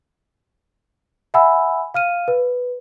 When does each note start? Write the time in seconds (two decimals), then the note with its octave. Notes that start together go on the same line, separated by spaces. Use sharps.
1.34 E5 F#5 G#5 B5 E6
1.94 F5 F6 D#7
2.28 B4